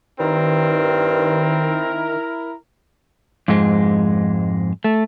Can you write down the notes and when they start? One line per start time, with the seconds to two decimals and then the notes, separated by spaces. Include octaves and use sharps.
0.20 G2 D#3 C4 E4 A#4
3.48 F2 G#2 G#3
4.84 A3